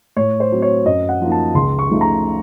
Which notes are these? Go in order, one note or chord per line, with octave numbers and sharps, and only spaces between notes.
A2 C#5
C5
F#3 C4
C#5
F#2 D#5
F#5
F3 A#3 D#4
A5
C#2 C6
C#6
C#3 F3 A3 D#4
A#5